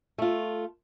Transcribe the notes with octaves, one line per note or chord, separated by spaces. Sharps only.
A3 F4